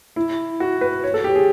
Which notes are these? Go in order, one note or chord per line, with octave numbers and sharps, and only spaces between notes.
E4
F#4
B4
C#5
A4
G4
G#4